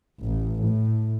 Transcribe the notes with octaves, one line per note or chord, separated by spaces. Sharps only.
A1
A2